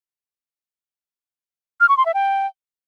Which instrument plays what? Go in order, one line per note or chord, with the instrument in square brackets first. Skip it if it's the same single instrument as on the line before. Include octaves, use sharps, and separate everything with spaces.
[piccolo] F6
C#6
C6
E5
G5